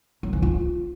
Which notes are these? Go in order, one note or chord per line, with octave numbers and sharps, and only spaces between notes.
F#3
E3
F4